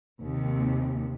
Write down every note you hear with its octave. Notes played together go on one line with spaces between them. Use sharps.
D#2 C3